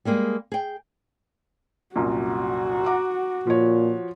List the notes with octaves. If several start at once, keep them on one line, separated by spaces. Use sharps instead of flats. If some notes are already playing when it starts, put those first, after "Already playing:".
G3 G#3 A#3 G#4
G#4 G5
C2 F#2 A#2 F#4
F#5 A#5 D6
A#2 F3 C#5